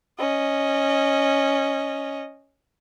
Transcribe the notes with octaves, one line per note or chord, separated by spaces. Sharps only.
C#4 D#5